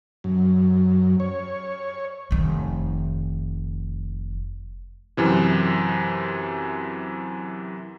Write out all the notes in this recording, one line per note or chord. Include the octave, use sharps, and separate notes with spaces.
F#2
C#5
F1 D#3
F#2 C3 E3